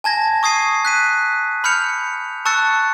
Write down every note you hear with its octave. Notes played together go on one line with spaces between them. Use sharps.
G#5 A5 G#6 A#6
C#6 D#6 G#6 C7 D#7
F#6 B6 D#7
B5 F6 G6 C#7 F7
A5 C#6 E6 F#6 A6 C#7